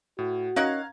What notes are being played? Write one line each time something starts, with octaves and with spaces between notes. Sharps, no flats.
A2 F#4
C#4 D#4 A#4 F5 F#5 A#5 G#6